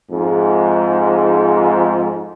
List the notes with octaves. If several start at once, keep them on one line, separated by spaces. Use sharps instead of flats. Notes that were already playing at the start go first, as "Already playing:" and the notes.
F2 G#2